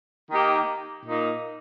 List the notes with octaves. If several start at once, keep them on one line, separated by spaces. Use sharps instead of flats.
D#3 A#3 D#4 G4
A#2 A#3 D#4